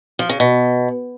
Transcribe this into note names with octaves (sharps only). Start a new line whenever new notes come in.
F3
C#3
B2